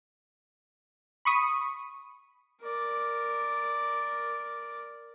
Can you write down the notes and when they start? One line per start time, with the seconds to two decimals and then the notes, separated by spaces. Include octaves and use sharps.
1.25 B5 C#6 D#6
2.61 A#4 D5